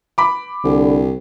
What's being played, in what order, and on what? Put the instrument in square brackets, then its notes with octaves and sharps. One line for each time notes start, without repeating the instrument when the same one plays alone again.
[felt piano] B5 D6
[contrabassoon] C2 [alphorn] D3